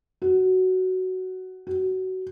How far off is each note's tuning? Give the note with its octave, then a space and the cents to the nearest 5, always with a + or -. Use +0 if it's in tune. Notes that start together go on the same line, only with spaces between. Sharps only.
F#4 +10
F#4 +20